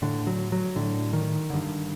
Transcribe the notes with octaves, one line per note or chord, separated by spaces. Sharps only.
A2 D3
F#3
F#3
A2 D3
D#3
G2 D3